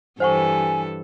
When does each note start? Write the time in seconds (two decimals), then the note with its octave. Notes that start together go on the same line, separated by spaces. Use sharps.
0.20 G2 E3 A4 C5 F#5 G#5 C#6